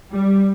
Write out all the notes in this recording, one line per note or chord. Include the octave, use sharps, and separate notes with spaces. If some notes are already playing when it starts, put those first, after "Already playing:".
G3